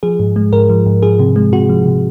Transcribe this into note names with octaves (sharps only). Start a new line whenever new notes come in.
F3 G#4
G#2
G#3
G#2 A#4
F3
G#2
F3 G#4
C3
G#3
C3 F#4
F3
C3